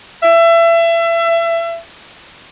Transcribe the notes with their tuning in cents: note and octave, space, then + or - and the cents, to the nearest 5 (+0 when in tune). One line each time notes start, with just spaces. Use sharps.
E5 +30